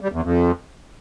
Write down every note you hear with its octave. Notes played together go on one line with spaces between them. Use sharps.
G3
E2
F2